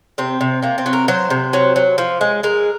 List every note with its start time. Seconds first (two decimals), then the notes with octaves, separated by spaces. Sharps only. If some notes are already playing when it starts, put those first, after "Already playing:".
0.18 C3 C4
0.41 C3
0.62 C3 A#3
0.78 C4
0.86 F#3
0.93 A#4
1.08 F#3 C5
1.30 C3
1.53 F#3
1.76 F#3
1.98 F3
2.21 G#3
2.43 G#3 A#4